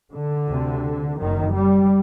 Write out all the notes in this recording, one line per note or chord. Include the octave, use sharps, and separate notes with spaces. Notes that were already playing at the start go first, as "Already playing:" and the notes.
D3
D2 C3
F#1 F#2 D#3
G3